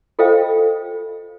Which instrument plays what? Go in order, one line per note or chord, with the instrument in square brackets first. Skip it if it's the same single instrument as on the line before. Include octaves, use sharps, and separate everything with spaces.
[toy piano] F4 A4 C5 D#5 F5 G5